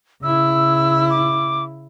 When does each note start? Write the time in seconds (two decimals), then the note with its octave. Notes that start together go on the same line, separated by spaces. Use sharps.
0.23 C#3 E4 E6
1.10 D6